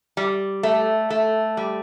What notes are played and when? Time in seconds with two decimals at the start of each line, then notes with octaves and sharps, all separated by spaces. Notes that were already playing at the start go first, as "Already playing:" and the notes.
0.17 G3
0.63 A3
1.10 A3
1.57 G3